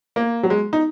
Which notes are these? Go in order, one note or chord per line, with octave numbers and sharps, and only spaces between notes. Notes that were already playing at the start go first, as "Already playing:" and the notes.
A#3
F#3
G#3
D#4